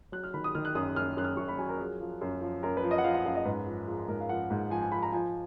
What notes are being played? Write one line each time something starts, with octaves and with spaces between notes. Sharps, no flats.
F#3 F#6
F6
D#3 B5
D#6
D#3 F6
F#6
F#2 D#6
F#2 F6
F#2 F#6
F6
F#2 C#6
B5
F#3 G#5
A#4
F3 G#4
F3
F#2
F3
F#2 A#4
B4
F3
D#5
F#5
F3 F5
F#5
F#2 F5
D#5
G#2 B4
F3
F3 G#4
G#2 A#4
F5
F3 F#5
G#2
F3 G#5
G#5
F3 B5
A#5
F3 G#5